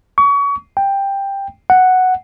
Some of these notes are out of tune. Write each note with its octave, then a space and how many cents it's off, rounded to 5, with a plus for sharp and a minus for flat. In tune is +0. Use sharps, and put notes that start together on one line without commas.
C#6 +30
G5 +10
F#5 +0